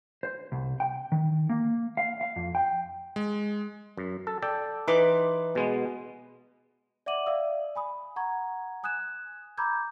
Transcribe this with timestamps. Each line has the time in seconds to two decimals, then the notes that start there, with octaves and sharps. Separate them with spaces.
0.23 C5
0.52 C2
0.80 G5
1.12 D#3
1.49 A#3
1.97 F5
2.21 F5
2.36 F2
2.55 G5
3.16 G#3
3.97 F#2
4.27 A4
4.42 A4 D5 G5
4.88 E3 D#4 B4 C6 D6
5.55 B2 G#3 B3
7.06 D5 E5 F#5 D6 D#7 F#7
7.26 D5 E5 F5 D#6 E6
7.76 G#5 B5 D#6
8.16 F#5 A#5 C#6 G#6
8.83 G#5 D#6 F#6 G#6 E7
9.58 A#5 B5 D6 E6 G6 G#6